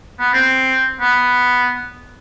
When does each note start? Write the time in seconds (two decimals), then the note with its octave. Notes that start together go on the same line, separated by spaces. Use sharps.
0.20 B3
0.33 C4
1.00 B3